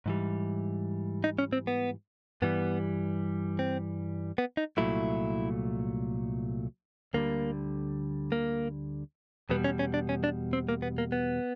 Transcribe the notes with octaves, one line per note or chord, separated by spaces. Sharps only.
G#2 E3 G3
D#4
C#4
C4
B3
G2 E3 G3 B3
C4
B3
D#4
C2 A#2 F#3 A3 E4
D2 D3 G3 A#3
A#3
E2 B2 G3 B3
C#4
C#4
D4
C#4
D4
C4
A#3
B3
A#3
B3